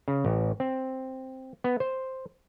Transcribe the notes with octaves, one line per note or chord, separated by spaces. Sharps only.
C#3
A1
C4
B3
C5